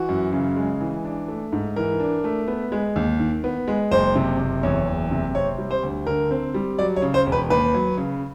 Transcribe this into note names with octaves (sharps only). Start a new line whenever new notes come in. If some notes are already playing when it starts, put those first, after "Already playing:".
Already playing: E3 F#4
F#2
C#3
G#3
E3
D4
A3
G#2
E3 A#4
D4
A3
B3
G#3
D#2
D#3
B3
G#3
F#1 C5
C3
F#1
E2 C#5
F#1
C3
C4 C#5
G3
C5
D2
D3 A#4
C4
G3
F#3 D5
C#5
C#3
C5
E1
B4
D#2 B4
F#3
C#3